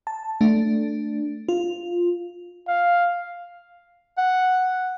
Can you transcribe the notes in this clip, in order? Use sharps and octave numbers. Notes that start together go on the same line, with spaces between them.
A5
A3 D4
F4
F5
F#5